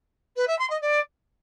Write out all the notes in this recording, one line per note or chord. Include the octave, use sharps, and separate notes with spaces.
B4
E5
C6
D#5
D5